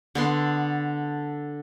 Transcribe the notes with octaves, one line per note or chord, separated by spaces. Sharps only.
D3 B3 C6